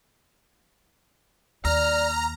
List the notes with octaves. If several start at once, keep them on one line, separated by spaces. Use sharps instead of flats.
D#2 D5 A#5 F6